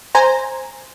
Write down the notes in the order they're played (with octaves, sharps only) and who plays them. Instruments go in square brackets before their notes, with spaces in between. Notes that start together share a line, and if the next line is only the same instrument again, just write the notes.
[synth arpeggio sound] C5 G#5 A#5